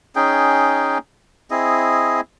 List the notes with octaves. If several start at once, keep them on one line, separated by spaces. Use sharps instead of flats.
C#4 D#4 G#4 G5
C4 E4 G#4 D#5